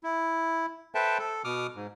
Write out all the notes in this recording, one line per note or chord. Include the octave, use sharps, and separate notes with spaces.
E4
A4 B4 C5 E5 G5 A5
A4
B2 D6 D#6 F6
G#2